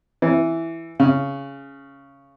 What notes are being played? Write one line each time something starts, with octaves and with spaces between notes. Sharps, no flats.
E3
C#3